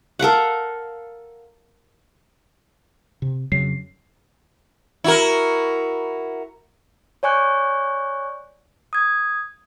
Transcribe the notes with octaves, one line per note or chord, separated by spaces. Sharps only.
A4 A#4 F5 F#5
C3
F2 C#3 F#3 C7
E4 F#4 A#4
C#5 D5 G#5 C#6 F#6 G6
D#6 G#6